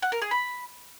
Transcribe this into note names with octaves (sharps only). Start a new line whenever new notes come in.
F#5
A#4
G#4
B5